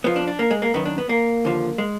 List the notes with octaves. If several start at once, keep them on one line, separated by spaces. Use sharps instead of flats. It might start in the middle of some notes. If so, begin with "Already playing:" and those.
F2 F3 B3
D4
D4
A#3
G#3
A#3
F#2 D#3 B3
D4
B3
A#3
D#2 D3 F3
G#3